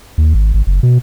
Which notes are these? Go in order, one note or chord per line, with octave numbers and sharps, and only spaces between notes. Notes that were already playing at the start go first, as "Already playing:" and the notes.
D#2
G#1
G#1
F#1
B2